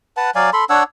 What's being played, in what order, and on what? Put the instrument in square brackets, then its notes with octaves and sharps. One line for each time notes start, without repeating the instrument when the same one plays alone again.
[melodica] B4 F#5 A5
F#3 D5 F5 G#5
A4 B5 C6
D4 C#5 F#5 E6